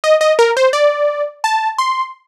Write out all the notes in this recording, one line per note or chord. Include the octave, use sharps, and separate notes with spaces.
D#5
D#5
A#4
C5
D5
A5
C6